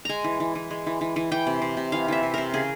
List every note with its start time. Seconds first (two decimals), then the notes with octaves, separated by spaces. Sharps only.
0.05 G#3 G#5 A#5
0.24 E3
0.40 E3
0.55 E3
0.70 G#3
0.86 E3
1.01 E3
1.16 E3
1.32 E3 G5
1.47 C3
1.62 C3
1.77 C3
1.92 E3 F5
2.08 E3 E5
2.23 C3
2.34 C3 A#4
2.54 C#3 G#4